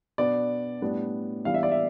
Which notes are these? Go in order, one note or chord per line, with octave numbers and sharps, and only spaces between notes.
B2 B3 D4 D5
A2 G3 B3 D4
E3 G3 B3 D4 F5
E5
D5
E5